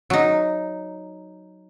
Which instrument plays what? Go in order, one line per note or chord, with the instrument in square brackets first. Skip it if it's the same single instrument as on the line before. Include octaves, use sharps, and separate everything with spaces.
[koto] F#3 D#4